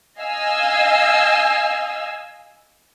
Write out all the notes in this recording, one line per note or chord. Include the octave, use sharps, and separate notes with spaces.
D#5 F5 G#5 E6